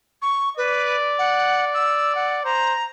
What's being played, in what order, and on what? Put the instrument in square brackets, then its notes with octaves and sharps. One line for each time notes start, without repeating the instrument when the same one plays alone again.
[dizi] C#6
[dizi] B4 [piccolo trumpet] D5
[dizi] F#5
E6
F#5
[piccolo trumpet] C5 [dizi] A#5